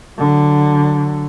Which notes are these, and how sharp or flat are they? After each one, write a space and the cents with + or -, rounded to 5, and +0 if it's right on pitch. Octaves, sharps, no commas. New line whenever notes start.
D3 +0 F#3 -5